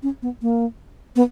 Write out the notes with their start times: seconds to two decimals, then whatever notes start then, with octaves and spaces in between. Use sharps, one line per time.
0.03 C#4
0.22 B3
0.42 A#3
1.16 B3